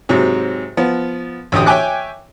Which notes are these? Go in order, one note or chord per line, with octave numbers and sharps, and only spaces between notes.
G#2 C3 F#3
F3 B3
A1 D2 G4 D#6
C#5 E5 G5 G#5 D6 F#6